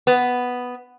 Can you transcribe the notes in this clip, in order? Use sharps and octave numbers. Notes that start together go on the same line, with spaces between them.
B3